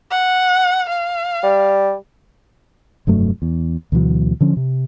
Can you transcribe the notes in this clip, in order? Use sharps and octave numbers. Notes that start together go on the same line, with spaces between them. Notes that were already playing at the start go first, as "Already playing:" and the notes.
F#5
F5
G3
F1 G2 F#3 A3
E2
D2 B2 E3 F#3
D3 F3 C#4
C3